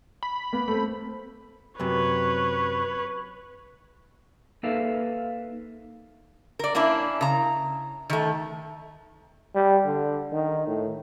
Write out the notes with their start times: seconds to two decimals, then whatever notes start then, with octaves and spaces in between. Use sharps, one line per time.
0.23 B5
0.53 A#3 B3
0.68 A3 C4 B5
1.80 F#2 C3 B4 C#5
4.63 A#3 D#4 A4 B4 E5 F5
6.59 A#4 D5
6.75 A#3 C#4 D4 E4
7.21 C#3 A#5
8.10 D#3 A3
9.55 G3
9.85 D3
10.33 D#3
10.67 A2